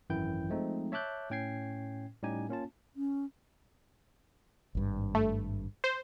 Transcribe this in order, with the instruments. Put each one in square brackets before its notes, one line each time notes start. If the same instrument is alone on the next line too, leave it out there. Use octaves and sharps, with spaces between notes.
[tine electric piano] G#1 F#2 E3 E4 G5 G6
F3 G#3 A3 C4 D#4
C#5 E5 A5 D6 F#6 G6
A2 C#4 G5 G#6 C7
A2 G3 C#4 D#4 G4 G#5
A#3 C#4 F4 A5
[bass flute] C#4
[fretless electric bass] G#1 G2
[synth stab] A3
C5